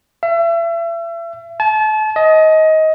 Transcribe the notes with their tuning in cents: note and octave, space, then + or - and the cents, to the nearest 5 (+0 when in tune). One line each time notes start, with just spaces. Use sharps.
E5 +35
A5 -35
D#5 +20